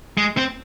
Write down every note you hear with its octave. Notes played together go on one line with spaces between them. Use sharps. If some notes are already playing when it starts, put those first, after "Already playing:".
G#3
C4